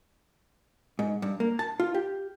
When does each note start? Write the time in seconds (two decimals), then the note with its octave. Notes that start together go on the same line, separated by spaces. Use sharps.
0.99 G#2
1.22 G2
1.40 A#3
1.59 A5
1.80 F4
1.94 G4